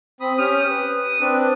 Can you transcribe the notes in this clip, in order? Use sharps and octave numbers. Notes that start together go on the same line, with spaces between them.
C4 B5 D#6
C#4 G4 D#6 F6
B4
C4 D4 B4